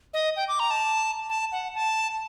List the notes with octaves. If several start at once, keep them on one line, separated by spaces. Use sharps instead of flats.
D#5
G5
D6
A#5
A5
A5
F#5
A5